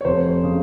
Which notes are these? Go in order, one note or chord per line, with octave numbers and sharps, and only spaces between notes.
C#5
F1 C5
C#3